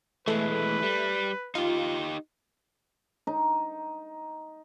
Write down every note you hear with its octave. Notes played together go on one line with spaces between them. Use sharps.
E3 G#3 A3 B4
G3
D#4 F4 G4
D#4